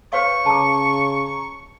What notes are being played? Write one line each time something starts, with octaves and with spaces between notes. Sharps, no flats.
B4 C#5 F5 C#6
C#3 A5 A#5 D6